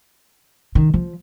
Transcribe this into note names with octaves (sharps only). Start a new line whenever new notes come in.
D#3
F3